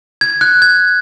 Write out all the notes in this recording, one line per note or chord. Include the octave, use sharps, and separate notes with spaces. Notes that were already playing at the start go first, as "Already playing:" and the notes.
G#6
F#6
G#6